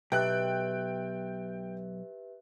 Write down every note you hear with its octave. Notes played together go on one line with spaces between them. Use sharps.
B1 G4 B4 E5 G5 F#6